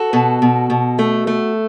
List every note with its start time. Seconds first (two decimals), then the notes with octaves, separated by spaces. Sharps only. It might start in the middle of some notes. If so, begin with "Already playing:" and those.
Already playing: F#4 A4
0.13 B2
0.42 B2
0.70 B2
0.99 A3
1.27 A3